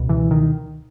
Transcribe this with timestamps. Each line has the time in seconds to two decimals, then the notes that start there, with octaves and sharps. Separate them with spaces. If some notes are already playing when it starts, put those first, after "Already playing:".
Already playing: C#2 B2
0.09 E3
0.31 D#3